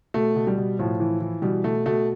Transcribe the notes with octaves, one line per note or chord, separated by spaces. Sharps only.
B2 A3
B2
G3
B2
A2 F3
E3
E3
B2 G3
B2 A3
B2 A3